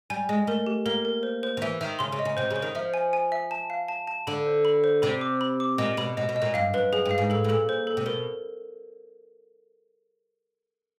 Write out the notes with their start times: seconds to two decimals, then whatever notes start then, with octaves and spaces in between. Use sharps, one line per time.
0.10 G3 G#5
0.29 G#3 D#5
0.47 A3 A#4
0.66 G4
0.86 A#3 A#4
1.05 A#4
1.23 C5
1.43 C5
1.57 D#3
1.62 E3 E5
1.81 D#3 E5
1.99 C#3 C6
2.12 C#3
2.19 D#5
2.25 C#3
2.37 C3 C5
2.50 C#3
2.56 C5
2.62 D#3
2.75 F3 E5
2.94 G#5
3.13 G#5
3.32 E5
3.51 A5
3.70 F5
3.88 A5
4.07 A5
4.27 D3 B5
4.46 C5
4.65 B5
4.84 C5
5.02 C3 B5
5.21 D6
5.41 B5
5.60 D6
5.78 A#2 D#5
5.97 B2 B5
6.17 B2 D#5
6.29 B2
6.36 D#5
6.42 A#2
6.54 G2 F5
6.74 F#2 B4
6.92 F#2 G#4
7.06 G2
7.11 F5
7.18 G#2
7.30 A2 A4
7.44 A2
7.49 A#2 A4
7.69 C5
7.87 A4
7.97 C3
8.06 B2 A#4